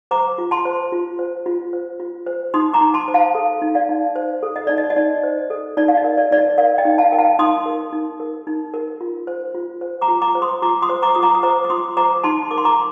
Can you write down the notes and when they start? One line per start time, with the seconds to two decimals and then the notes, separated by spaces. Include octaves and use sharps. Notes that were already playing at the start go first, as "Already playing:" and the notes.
0.11 C5 A#5 D6
0.38 F4
0.51 A5 C6
0.65 C5
0.92 F4
1.19 C5
1.46 F4
1.73 C5
2.00 F4
2.26 C5
2.54 D#4 C6 D#6
2.73 A#5 D6
2.81 D#4
2.94 A5 C6
3.08 C5
3.14 F5 A5
3.35 A4
3.62 D#4
3.75 D5 F5
3.89 D#4
4.16 C5
4.43 A4
4.56 D#5
4.67 D#4 D5
4.78 D#5
4.90 D#5
4.96 D#4 D5
5.23 C5
5.50 A4
5.77 D#4 D5
5.88 F5
5.97 D#5
6.04 A#4
6.17 D5
6.31 D#4 D5
6.38 D#5
6.58 A#4 D5 F5
6.78 D#5 G5
6.85 D#4
6.98 F5 A5
7.12 A#4 G5
7.18 F5 A5
7.39 D#4 C6 D#6
7.66 A#4
7.93 D#4
8.20 A#4
8.47 D#4
8.74 A#4
9.01 F4
9.27 C5
9.54 F4
9.81 C5
10.01 A#5 D6
10.08 F4
10.22 A#5 D6
10.35 C5
10.42 C6 D#6
10.62 F4 A#5 D6
10.82 C6 D#6
10.89 C5
11.02 A#5 D6
11.15 F4 D#6
11.23 A#5 D6
11.35 D#6
11.43 C5 A#5 D6
11.64 D6
11.70 F4 C6 D#6
11.97 C5 A#5 D6
12.24 D#4 A5 C6
12.51 A#4 D6
12.58 C6
12.65 A#5 D6